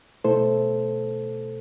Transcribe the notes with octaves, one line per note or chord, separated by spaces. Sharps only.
B2 A3 E4 A4 C5